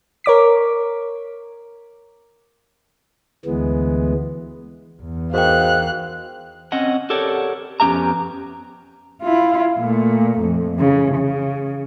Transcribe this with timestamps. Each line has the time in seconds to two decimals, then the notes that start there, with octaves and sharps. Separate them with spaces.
0.24 A#4 C#5 D6 B6
3.45 D2 E3 G#3 B3
5.02 E2
5.34 G#2 F#4 A#4 F5 G5 F#6
6.72 C4 C#4 D#5 F#5
7.10 G4 A4 A#4 C#5 D5 F#5
7.80 F2 B3 C#4 G4 E5 A#5
9.22 E4 F4
9.79 A#2 A3
10.41 F2
10.75 C#3 E3
11.15 C#3